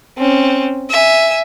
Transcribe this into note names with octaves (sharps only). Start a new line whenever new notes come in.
C4 C#4
E5 G#5